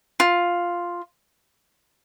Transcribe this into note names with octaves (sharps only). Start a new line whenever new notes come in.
F4